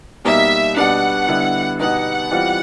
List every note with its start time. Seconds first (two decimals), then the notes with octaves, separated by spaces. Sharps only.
0.25 B2 G3 A#3 D#4 E5
0.76 B2 G3 B3 D4 F#5
1.28 D3 G3 B3 E4
1.80 B2 G3 B3 D#4 F#5
2.31 E3 G3 C4 F4